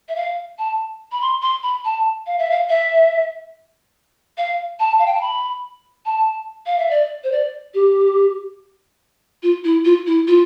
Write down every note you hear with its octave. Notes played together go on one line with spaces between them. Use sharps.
E5
F5
A5
B5
C6
C6
B5
A5
F5
E5
F5
E5
F5
A5
F5
G5
A5
B5
A5
F5
E5
D5
C5
D5
G4
F4
E4
F4
E4
F4